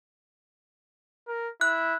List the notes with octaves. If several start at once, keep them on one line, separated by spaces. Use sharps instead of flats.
A#4
E4 F#6